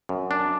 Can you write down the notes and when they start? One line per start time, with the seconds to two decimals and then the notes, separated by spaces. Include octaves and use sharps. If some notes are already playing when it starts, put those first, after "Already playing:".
0.09 F#2
0.31 D4